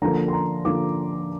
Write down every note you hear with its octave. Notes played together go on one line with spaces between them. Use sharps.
D3 F3 A#3 A#5
C6
A#5
D3 F3 A#3 D6